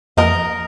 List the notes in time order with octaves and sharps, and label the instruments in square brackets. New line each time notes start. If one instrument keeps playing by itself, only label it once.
[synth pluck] F2 F3 A#3 [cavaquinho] A#4 D#5